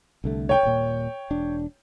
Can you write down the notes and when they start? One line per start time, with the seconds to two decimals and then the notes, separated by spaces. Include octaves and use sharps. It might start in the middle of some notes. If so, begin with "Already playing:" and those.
0.24 C2 D3 A3
0.49 C#5 G5
0.63 D#1 A#2
1.30 E1 D4